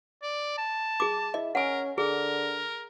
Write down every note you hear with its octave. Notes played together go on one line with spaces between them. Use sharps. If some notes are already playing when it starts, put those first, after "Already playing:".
D5
A5
G#4 D6
E4 D#5
C#4 A#4 F#5 G#5
D3 G#4 A#4